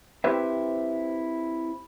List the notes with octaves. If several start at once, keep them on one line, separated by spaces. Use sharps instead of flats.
C4 E4 G4 B4 C5 E5